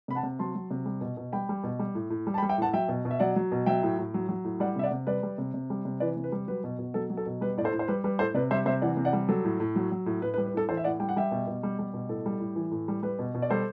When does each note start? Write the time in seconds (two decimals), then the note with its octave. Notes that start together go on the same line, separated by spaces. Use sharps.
0.08 C3 B5
0.15 F#5 A5
0.23 C3
0.39 F#3 A5 C6
0.55 F#3
0.71 C3
0.86 G3
1.01 B2
1.17 B2
1.32 G3 G5 B5
1.49 G3
1.64 B2
1.79 G3
1.95 A2
2.10 A2
2.27 G3
2.34 A5
2.38 G5 B5
2.42 G3
2.49 E5 G5
2.58 A2 F#5 A5
2.73 F#3 E5 G5
2.89 B2
3.05 B2
3.11 E5
3.20 F#3 D5 F#5
3.36 F#3
3.52 B2
3.66 F#3 E5 G5
3.83 A2
3.98 A2
4.14 F#3
4.29 F#3
4.44 A2
4.60 G3 D5 F#5
4.76 C3 E5
4.83 D5 F#5
4.91 C3
5.07 G3 B4 D5
5.23 G3
5.38 C3
5.54 C3
5.70 G3
5.85 C3
6.00 E3 B4 D5
6.16 C3
6.24 B4
6.32 G3
6.48 F#3 B4
6.64 B2
6.79 B2
6.94 F#3 A4
7.10 F#3
7.17 A4
7.26 B2
7.41 G3 B4
7.57 A2 D5
7.64 A4 C5
7.72 A2
7.79 C5
7.88 G3 B4
8.04 G3 B4
8.19 A2 A4 C5
8.34 C3 B4 D5
8.51 G3 C5 E5
8.66 C3 C5 E5
8.82 E3 D5 F#5
8.97 C3
9.05 D5 F#5
9.13 G3
9.29 F#3 A4
9.44 A2
9.60 A2
9.76 F#3
9.91 F#3
10.06 A2
10.22 A2 B4
10.34 B4
10.38 G3
10.46 B4
10.54 A2 A4
10.69 E3 A4 C5
10.77 E5
10.84 A2 D5 F#5
11.00 G3 G5
11.09 F#5
11.16 G3 E5 G5
11.31 B2
11.47 B2
11.63 G3
11.79 G3
11.94 B2
12.09 A2 A4
12.26 G3
12.40 A2
12.56 E3
12.71 A2
12.88 G3
13.03 G3 B4
13.19 B2
13.34 B2
13.42 D5
13.50 G3 A4 C5